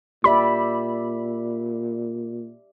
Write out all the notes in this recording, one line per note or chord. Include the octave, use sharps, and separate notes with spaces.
A#2 G4 D5 E5 B5